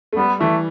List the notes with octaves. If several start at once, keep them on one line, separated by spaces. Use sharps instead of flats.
A3
G3 B3
E3 A3